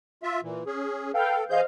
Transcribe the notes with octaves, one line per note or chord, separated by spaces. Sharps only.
F4 E5
A#2 E3
C#4 G#4
A4 B4 F5 G5
E3 G#4 C5 D#5 F5 G6